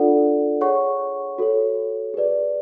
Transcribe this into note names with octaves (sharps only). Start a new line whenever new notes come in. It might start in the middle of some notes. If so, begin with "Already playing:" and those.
Already playing: D4 F4 A4 D5 F#5
G#4 C#5 F#5 C#6
F#4 A4 C#5
G#4 B4 D5